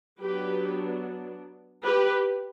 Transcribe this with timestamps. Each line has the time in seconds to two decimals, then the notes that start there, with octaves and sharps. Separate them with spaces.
0.20 F#3 B3 D4 G4 B4
1.85 G4 B4